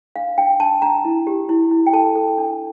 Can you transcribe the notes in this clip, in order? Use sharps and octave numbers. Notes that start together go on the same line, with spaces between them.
D4 F5
D4 G5
D4 A5
D4 A#5
E4
G4
E4
E4
G5
A4 A5
A4
D4